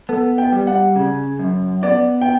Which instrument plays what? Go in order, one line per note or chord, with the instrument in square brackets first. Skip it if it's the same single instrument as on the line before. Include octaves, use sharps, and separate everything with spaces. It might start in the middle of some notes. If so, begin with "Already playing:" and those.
[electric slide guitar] B3 [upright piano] A4
[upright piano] G5
[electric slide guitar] G3
[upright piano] F#5
[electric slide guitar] C#3
F#2
[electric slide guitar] B3 [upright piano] D5
[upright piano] G5